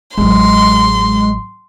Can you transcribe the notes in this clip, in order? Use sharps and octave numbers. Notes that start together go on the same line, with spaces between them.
A1 F#3 G#3 C6